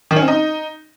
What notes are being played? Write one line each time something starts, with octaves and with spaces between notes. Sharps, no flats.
D#3
C#4
C4
D#4